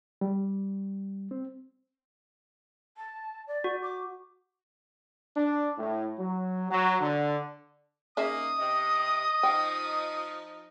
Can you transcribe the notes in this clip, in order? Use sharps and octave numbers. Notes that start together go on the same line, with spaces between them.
G3
C4
A5
D5
F#4
D6
D4
A2
F#3
F#3
D3
A#3 C#4 D#4 G#4 E5 D#6
C3 D#5
F3 D#4 G5